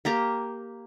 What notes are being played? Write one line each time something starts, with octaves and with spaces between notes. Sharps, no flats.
A#3 G4 A#5